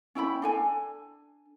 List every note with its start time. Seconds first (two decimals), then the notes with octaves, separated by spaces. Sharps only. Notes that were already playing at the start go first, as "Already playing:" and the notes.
0.15 C#4 E4 G5 B5
0.42 D4 A4 G#5